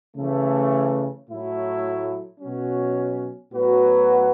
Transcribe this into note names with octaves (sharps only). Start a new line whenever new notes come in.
C#3 E3 A3
A2 F#3 A3 E4
B2 F#3 C#4
A2 F#3 B3 F#4 B4